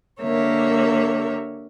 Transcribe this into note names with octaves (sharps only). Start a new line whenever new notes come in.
D3 A#3 G4 A#4 C#5 E5